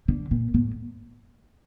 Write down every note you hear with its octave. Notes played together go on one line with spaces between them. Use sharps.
D3
A#2
A2